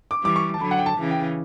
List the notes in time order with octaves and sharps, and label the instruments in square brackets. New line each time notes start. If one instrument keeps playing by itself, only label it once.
[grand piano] D6
[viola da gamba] E3 G3 [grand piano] D6
[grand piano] C#6
A5
[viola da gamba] D3 F#3 [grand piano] B5
[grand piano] F#5
G5
A5
[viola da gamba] C#3 E3
[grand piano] G5